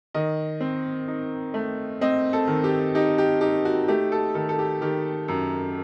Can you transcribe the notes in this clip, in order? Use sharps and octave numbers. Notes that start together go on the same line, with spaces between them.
D#3 D#5
C4
D#4
A3
C4 D#5
A4
D#3
G4
D#4 G4
G4
D#4 G4
F#4
A3 G4
A4
D#3 A4
A4
G4
D#3 G4
F#2